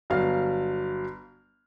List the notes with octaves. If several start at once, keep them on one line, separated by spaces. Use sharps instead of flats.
G1 F#3 F5 F6